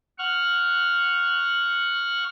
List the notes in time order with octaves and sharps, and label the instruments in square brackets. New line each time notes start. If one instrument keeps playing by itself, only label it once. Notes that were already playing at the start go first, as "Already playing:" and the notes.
[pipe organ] F#5 C#6 F6